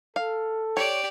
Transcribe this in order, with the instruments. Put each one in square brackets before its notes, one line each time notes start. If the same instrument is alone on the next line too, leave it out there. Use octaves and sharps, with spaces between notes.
[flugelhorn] A4 [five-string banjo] F5
[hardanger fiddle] G4 D5 [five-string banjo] C#5